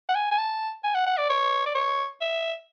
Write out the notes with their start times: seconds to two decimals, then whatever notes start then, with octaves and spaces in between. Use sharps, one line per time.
0.09 F#5
0.15 G#5
0.31 G#5
0.38 A5
0.84 G#5
0.95 F#5
1.07 F#5
1.17 D5
1.30 C#5
1.66 D5
1.75 C#5
2.21 E5